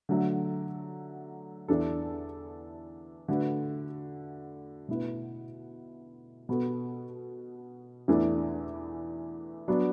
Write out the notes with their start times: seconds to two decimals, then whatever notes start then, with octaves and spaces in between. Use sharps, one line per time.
0.09 D3 F#3 A3
1.68 E2 E3 D4 A4
3.28 D3 A3 F#4 B4
4.88 B2 A3 E4 B4
6.49 B2 B3 F#4 A4
8.08 E2 E3 A3 D4
9.68 F#3 B3 D4 F#4